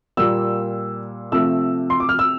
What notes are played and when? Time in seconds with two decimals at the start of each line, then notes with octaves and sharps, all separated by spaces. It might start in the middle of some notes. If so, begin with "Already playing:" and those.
0.17 A#2 G3 A#3 E6
1.32 C3 F3 A3 E6
1.90 C6
2.00 D6
2.09 F6
2.19 E6